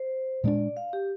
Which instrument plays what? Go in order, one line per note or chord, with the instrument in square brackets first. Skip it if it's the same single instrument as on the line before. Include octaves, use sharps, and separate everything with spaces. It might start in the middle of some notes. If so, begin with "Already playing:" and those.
Already playing: [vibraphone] C5
[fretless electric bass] A#2 G#3 D4 [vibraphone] D5
[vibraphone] F5
G4